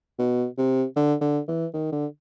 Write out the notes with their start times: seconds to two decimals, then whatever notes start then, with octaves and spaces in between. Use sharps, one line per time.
0.19 B2
0.58 C3
0.96 D3
1.21 D3
1.48 E3
1.74 D#3
1.93 D3